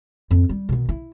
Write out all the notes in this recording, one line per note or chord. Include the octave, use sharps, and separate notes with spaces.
F2
G3
B2 D#3
E4